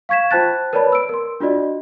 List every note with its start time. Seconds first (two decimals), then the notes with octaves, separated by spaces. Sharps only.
0.09 F5 C#6 G#6 B6 E7
0.31 F4 C5 G5 A5 F#6 A6
0.73 A#4 B4 C#5 D5 A5 B5
0.92 E6 D7
1.09 A#4 C6
1.40 D4 F4 F#4 D5 D#5